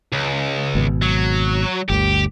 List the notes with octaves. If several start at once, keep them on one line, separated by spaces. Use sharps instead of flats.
C#2
G#1 B2
F#3
G1 D2 G4